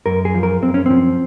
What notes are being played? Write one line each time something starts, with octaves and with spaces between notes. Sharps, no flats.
F#2 A#4
G#4
F3
A#4
F#2 C4
C#4
F3 C4